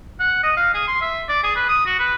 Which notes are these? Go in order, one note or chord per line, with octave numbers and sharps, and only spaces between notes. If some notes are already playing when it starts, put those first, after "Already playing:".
F#5
D#5
F5
G#4
C6
E5
D5
G#4
B4
D#6
F#4
B4